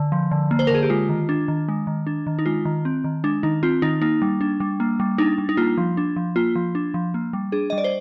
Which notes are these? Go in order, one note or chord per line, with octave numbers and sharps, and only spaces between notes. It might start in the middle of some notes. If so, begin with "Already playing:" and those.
Already playing: D3
F3
D3
A#3
C5
A#4
D3 G#4
G4
G#3 F4
D#3
D4
D#3
G#3
D#3
D4
D#3
D#4
G#3 F4
D#3
C4
D#3
G#3 D4
D#3 D#4
C4 F4
D#3 D#4
A#3 D#4
G3
D4
G3
A#3
G3
D4 D#4
G3
D#4
A#3 F4
F3
D4
F3
A#3 F4
F3
D4
F3
A#3
G3
D4 G#4
D#5
G3
D5
C5